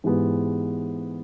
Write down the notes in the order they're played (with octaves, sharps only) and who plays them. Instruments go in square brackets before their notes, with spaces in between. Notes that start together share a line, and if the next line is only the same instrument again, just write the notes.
[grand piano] G#2 E3 G#3 B3 G4